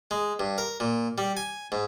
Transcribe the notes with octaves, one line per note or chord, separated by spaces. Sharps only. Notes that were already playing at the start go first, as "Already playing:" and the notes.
G#3
G2
A#4
A#2
G3
G#5
G#2